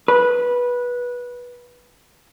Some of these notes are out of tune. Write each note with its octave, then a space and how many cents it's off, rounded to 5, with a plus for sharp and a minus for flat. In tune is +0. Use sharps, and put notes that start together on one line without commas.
B4 -15